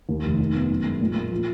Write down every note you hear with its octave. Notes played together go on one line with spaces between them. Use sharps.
D#2
F1
D#3
B3
F#2
G#3
A#2
A#3
F3